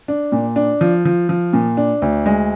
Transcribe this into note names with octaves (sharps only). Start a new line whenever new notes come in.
D4
A#2
D4
F3
F3
F3
A#2
D4
D2
G#3